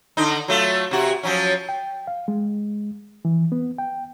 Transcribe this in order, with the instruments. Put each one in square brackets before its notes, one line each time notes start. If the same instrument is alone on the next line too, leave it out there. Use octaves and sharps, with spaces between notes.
[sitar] D3 D#4
F#3 A3 F4
C3 F#4
F3 F#3 C#4
[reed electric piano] G5
F5
G#3
E3
B3
G5